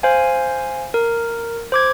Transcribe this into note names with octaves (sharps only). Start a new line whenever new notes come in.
C5 F5 G#5
A#4
C5 D6 G#6